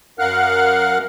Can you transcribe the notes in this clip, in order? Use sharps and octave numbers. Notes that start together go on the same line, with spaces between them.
F#2 A#4 F5 F#5 F6 F#6